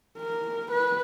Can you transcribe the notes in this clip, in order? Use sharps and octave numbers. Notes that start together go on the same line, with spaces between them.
A#4
B4